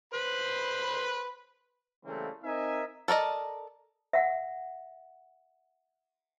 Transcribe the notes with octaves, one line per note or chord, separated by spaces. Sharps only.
B4 C5 B5
C#3 E3 G3 A3 A#3 C4
C4 D#4 A#4 D#5 E5 G#5
A4 A#4 D5 D#5
E5 F#5